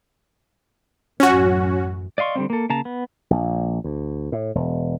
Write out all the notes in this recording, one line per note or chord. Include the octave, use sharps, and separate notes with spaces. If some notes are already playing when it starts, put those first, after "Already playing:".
A1 F#2 C#4 F#4
D5 D#5 F5 C6 C#6
D3 G3 B3 C4
A#3 A4
C#3 A#3 A5 A#5
B3
A#1
D2
A2
E1